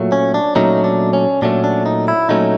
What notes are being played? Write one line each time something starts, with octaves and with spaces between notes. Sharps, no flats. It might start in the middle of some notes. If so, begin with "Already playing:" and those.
Already playing: A#2 F#3 A3
C#4
D4
A#2 F#3 A3 C#4 D#4
D4
C#4
A#2 F#3 A3 C#4 D4
D4
D#4
E4
A#2 F#3 A3 C#4 D#4